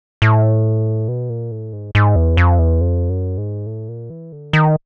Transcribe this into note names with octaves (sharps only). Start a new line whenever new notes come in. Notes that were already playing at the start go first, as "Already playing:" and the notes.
A2
B2
A#2
A2
G#2
G#2
E2
F2
E2
F2
F#2
G#2
A2
A#2
E3
D3
D#3